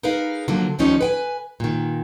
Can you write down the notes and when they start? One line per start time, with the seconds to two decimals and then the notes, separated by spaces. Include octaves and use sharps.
0.03 D#4 G#4 A#4 B4 F5
0.48 D3 F3 F#3 A#3
0.79 D2 D#3 F3 G3 C#4 D#4
1.01 B4 G5 G#5
1.60 A#2 D#3